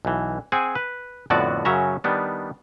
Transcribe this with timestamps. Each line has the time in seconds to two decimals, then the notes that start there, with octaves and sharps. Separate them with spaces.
0.05 B1 E3
0.52 C4 G#4 F#5 G#5
0.75 B4
1.30 F2 A2 D3 B3 F#4 D5
1.65 F#2 C#3 F#3 C#4 E5 A#5
2.04 D#3 G3 B3 D4